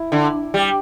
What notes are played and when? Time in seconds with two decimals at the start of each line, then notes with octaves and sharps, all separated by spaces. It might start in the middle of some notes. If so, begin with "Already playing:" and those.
Already playing: E4
0.12 D3
0.54 G3